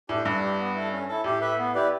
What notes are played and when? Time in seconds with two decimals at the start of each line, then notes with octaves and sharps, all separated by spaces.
0.09 A2 D4 G4 B4
0.25 G2 E4
0.43 G4 B4
0.60 B3
0.75 E4 A4
0.92 C#4
1.08 E4 A4
1.24 A2 G4
1.41 B4 E5
1.58 B3
1.75 E4 G4 B4 D5